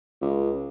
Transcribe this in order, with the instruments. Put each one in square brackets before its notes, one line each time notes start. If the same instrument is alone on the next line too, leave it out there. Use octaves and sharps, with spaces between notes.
[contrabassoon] C#2